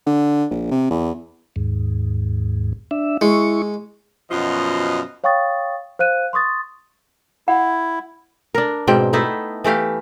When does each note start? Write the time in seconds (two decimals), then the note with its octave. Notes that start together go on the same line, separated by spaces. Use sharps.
0.06 D3
0.51 A#1
0.72 C3
0.90 E2
1.56 D#2 G#2
2.91 D4 E5
3.21 G#3 E4 C#6
4.31 F#2 B2 F3 F4 D#5
5.24 C#5 F5 G5 C#6 D#6 A6
5.99 C5 F5 F#6 D#7
6.33 C6 C#6 D#6 A6
7.48 E4 F#5
8.55 D4 A#4
8.87 G#2 B2 C4 G5
9.13 A3 B3 D#4 E4
9.64 E3 A3 G4 F5